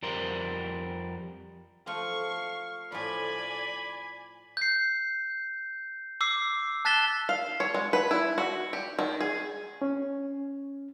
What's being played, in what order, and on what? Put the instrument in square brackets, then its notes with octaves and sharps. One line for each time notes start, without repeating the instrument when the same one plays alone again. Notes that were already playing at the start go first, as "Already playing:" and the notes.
[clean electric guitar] F2 G3 A#4 C5
[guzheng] F3 A3 [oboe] F5 [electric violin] C#6
[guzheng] A2 F3 [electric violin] D5 G#5 [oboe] B5
[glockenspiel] G6 C7
D6 E6 C7
A5 F#6 A6 B6 E7 G7
[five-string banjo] F5
C#5
G#3
B4
E4
F#4
G4
D#3
G#4
[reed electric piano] C#4